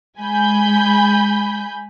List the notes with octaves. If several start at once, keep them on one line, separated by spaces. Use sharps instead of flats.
G#3 G#5 B5 G6